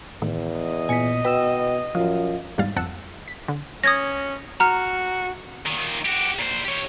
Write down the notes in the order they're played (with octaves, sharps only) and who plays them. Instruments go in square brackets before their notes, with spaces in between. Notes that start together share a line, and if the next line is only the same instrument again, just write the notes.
[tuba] E2 [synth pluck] A2 D#3
[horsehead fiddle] D#5
[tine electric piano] A#2 B3 B6 [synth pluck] G#5 C#7
[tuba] B2 [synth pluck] B4 E6 E7 [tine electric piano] G5
[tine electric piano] A1 F4 F5 [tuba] F#2 [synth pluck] F3
[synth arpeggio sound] E2 G#2 G3 F5 A6
G1 F2 F#5 A5 E6
B6
D3
[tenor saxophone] C#4 [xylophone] D#6 G#6 A#6
[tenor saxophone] F#4 [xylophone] A#5 F6
[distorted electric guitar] A#2 D#3
F#4 G4
A#2 C5
G4 C#5